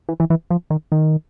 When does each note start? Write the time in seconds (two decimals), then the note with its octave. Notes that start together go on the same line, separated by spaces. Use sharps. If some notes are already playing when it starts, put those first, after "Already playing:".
0.09 E3
0.20 E3
0.30 E3
0.50 F3
0.70 D#3
0.92 D#3